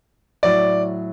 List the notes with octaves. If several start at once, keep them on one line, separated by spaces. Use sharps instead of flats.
A2 F#3 D5